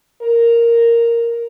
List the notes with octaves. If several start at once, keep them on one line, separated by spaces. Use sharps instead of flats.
A#4